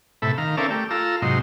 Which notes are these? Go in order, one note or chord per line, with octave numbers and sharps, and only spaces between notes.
A2 C3 A4 E5 B5
D#3 F5 A#5
C4 C#4 A4 A#4 D5 E5
A3 G4
F4 A4 A#5 E6
G#2 C3 F#3 D#4 C6